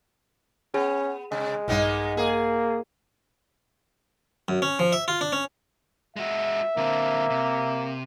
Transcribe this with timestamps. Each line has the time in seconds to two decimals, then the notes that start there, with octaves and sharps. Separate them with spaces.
0.74 B3 C#4 G#4
1.32 C3 G#3
1.68 A#1 G2 A#3 B3 D#4
2.17 A#3 G#4
4.48 F#2
4.62 C#4
4.79 F3
4.92 E5
5.08 F4
5.21 D4
5.32 C#4
6.16 G#3 F#4 E5
6.77 D3 A#3 C4
7.30 C3